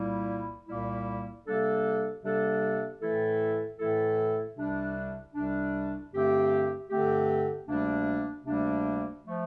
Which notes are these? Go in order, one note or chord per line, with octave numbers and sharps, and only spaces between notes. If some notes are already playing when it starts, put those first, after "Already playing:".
Already playing: C2 A#2 G3 A#3 E4
C2 A#2 G3 A#3 E4
C3 G3 A#3 D4 A4
C3 G3 A#3 D4 A4
A2 E3 A3 E4 A4
A2 E3 A3 E4 A4
C2 C3 G3 D4
C2 C3 G3 D4
G2 D3 A3 C4 G4
G2 D3 A3 C4 G4
D2 C3 G3 A#3 D4
D2 C3 G3 A#3 D4
F3 A3